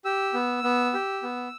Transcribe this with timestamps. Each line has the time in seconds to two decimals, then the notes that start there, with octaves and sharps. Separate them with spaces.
0.05 G4 E6
0.34 B3
0.64 B3
0.94 G4
1.23 B3